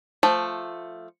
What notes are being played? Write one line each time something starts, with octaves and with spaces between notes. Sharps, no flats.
F3 A3